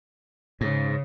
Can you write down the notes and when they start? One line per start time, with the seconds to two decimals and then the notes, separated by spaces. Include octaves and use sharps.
0.61 G#2 C#3